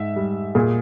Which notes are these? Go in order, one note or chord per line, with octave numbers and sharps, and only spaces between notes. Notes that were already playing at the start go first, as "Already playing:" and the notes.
Already playing: G#2 E5
G3
A#2 G#4